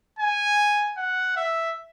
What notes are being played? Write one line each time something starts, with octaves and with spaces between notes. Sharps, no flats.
G#5
F#5
E5